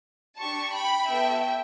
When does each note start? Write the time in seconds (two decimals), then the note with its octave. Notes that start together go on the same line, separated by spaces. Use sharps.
0.39 D4 G4 A5 C#6
0.74 G5 B5
1.08 B3 F#4 A4 E5 G5